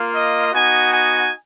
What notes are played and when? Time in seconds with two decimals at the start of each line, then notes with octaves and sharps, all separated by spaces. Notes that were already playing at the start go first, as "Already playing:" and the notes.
Already playing: A#3 F4
0.14 D#5
0.53 B3 D#4 F#4 G#5
0.92 G#5